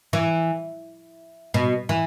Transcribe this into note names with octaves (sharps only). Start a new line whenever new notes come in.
E3
B2
E3